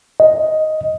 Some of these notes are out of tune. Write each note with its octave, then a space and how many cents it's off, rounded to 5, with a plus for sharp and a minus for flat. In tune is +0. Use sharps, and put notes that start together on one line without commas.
D#5 +5